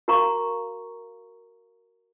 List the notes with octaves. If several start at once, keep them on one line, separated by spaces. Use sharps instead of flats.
F#4 A#4 F5 A#5 C#6 D6